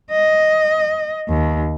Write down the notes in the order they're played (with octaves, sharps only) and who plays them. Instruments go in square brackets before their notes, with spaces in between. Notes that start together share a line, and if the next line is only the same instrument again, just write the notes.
[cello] D#5
D#2